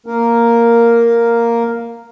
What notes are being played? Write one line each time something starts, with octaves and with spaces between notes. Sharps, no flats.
A#3 A#4